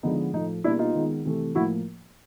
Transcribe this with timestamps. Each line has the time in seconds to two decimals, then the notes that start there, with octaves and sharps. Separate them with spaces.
0.03 D3 F3 G#3 B3 D#4
0.33 A2 F3 A3 D#4
0.64 B2 G3 A#3 D4 E4
0.79 D#4 F4
0.94 D#3 G#3 B3
1.25 C3 E3 A3
1.55 A2 F3 A#3 E4 F#4